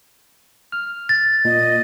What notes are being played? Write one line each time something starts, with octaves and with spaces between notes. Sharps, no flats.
F6
A6
A#2 D#5